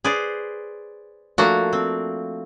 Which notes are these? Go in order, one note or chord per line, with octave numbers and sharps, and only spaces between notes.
G#4 B4 C5 D5
F3 A3 A#3 D4 F#4
C4